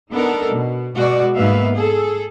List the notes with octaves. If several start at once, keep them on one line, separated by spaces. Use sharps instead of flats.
B3 D4 D#4 A4 A#4
B2
B2 G#3 F#4 D5
G#2 A#3 B3 B4 E5 F5
G#4 A4